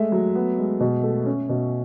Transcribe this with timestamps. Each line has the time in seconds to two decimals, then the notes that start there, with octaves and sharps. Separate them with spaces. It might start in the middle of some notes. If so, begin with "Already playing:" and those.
Already playing: G#3 A3 E5
0.12 F#3
0.35 B3
0.59 G#3
0.80 B2
1.03 A3
1.26 C#4
1.49 B2